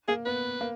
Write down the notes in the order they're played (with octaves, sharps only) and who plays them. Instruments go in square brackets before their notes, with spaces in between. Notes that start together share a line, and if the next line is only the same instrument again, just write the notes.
[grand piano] A#3 [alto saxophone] G#4
[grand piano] B3 [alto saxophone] B4
[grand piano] A#3